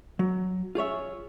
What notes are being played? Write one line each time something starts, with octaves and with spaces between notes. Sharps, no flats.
F#3
F4 G#4 C#5 E5